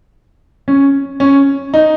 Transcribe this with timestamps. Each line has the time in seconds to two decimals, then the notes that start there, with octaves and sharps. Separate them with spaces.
0.68 C#4
1.20 C#4
1.74 D#4